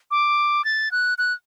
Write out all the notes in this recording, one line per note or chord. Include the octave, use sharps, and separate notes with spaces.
D6
A6
F#6
F#6